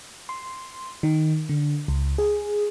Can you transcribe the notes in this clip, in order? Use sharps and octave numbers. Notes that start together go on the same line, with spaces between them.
C6
D#3
D3
C#2
G#4